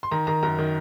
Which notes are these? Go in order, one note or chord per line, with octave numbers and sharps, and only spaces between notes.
C6
D#3 A#5
D#3 A#5
F#2 A#5
D#3